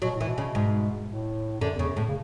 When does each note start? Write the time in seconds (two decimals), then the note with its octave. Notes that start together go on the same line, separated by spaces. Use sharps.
0.02 B2 F#3
0.15 A2
0.21 E3
0.28 B2
0.38 C#3
0.55 G#2
1.09 A2
1.61 F#2 D3
1.75 E2 C#3
1.89 F#2
1.97 A2
2.08 C#3